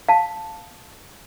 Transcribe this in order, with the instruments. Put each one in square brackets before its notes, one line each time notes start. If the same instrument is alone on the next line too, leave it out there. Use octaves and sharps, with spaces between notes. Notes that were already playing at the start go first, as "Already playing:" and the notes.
[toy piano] F5 A5